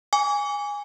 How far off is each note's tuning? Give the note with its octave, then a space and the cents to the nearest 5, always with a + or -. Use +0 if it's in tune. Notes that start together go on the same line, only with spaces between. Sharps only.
G#5 -15 D6 -40